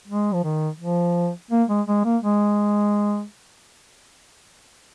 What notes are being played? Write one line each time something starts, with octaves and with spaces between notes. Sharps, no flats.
G#3
F3
D#3
F3
A#3
G#3
G#3
A#3
G#3